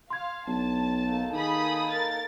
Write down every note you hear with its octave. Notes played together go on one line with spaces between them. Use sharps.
F5 C6 G#6
B1 D4 A5
A#3 D#4 A4
D#3 G#4 B5 D#6
A#4 A6